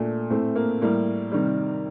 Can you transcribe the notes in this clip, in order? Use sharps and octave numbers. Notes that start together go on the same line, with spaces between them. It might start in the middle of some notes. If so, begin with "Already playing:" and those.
Already playing: A#2 A3 D4
A2 A3 C4
A#3
A2 G3 A#3
C3 D#3 G3